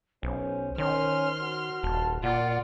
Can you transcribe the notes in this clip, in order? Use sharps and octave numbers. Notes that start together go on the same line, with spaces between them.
B1 C#4 C5
D#3 C#4 C6 F6
F#4
D#1 A5
A#2 F4 D5 F#5